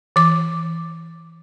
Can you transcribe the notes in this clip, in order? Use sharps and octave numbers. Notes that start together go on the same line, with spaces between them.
E3 D6